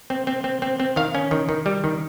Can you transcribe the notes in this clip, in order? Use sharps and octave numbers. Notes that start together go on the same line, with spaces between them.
C4
C4
C4
C4
C4
D#3 F5
C#4
D#3
D#3
G3
D#3